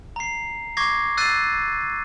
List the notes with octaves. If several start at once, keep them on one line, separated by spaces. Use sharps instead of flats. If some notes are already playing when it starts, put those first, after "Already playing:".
A#5 C7
C#6 D6 G#6 A#6 C7
E6 F#6 A6 C7 D#7